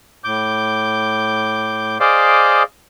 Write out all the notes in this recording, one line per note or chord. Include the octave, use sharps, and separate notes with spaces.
A2 D6 G6
G#4 C5 D5 D#5 F5 D6